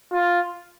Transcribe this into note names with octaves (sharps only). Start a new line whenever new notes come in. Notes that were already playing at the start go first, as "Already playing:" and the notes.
F4